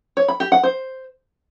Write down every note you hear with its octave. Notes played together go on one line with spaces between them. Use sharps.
C#5
B5
G4
F#5
C5